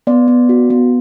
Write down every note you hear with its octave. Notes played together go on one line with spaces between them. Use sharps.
B3 D5
B3
F#4
B3